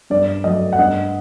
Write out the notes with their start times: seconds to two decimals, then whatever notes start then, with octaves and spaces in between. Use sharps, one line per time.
0.10 G2 D5
0.44 F#3 A3 D#5
0.73 F#5
0.78 G2 D#5